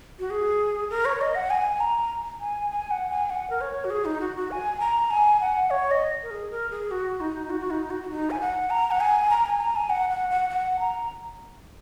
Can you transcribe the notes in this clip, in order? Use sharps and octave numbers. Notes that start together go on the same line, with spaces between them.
F#4
G#4
A#4
C#5
D#5
F#5
G#5
A#5
G#5
G#5
F#5
G#5
F#5
A#4
C#5
F#4
G#4
D#4
F#4
F#4
G#5
A#5
G#5
F#5
C#5
D#5
A#4
G#4
A#4
G#4
F#4
D#4
F#4
F#4
D#4
F#4
F#4
D#4
G#5
F#5
A#5
F#5
G#5
A#5
G#5
A#5
G#5
F#5
F#5
F#5
F#5
A#5